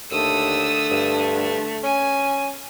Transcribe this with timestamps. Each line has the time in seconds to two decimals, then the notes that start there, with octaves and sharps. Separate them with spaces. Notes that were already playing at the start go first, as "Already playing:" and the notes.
0.11 D#2 D3 A3 D#6 E6
0.91 G2
1.83 C#4 G#5